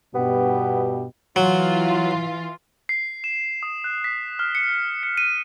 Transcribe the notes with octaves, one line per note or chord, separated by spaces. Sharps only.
G2 B2 B3 G4
E3 F#3 F4
C7
E7
D#6
F#6
B6
F6
C#7
C#7
D#7